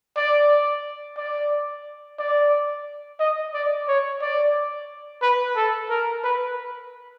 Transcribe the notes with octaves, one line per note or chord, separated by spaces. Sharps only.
D5
D5
D5
D#5
D5
C#5
D5
B4
A4
A#4
B4